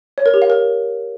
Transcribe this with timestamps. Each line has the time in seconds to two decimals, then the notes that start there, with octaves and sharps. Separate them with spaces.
0.18 C#5
0.26 A#4
0.34 G4
0.42 F5
0.50 A#4